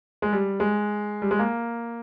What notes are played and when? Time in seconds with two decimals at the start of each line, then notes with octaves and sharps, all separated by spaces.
0.22 G#3
0.33 G3
0.60 G#3
1.22 G3
1.31 G#3
1.39 A#3